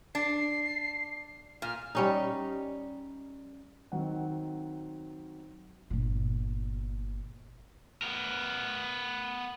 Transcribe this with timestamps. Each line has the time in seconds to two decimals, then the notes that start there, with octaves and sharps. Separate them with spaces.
0.15 D4 C7
1.62 A#2 F6
1.95 G3 C#4 D#4
3.92 D#3 F#3 C4 F#5
5.90 G1 A#2
8.02 B3 A#4